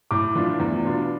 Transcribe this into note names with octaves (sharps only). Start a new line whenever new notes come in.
A2 D6
E3 A3 D4 F4
E2
B2 B3 D4 F4